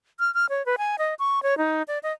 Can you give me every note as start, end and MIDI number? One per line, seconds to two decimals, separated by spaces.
0.20 0.33 89
0.34 0.46 89
0.49 0.65 73
0.66 0.76 71
0.78 0.96 80
0.98 1.14 75
1.19 1.42 85
1.43 1.57 73
1.58 1.83 63
1.88 1.99 74
2.03 2.13 75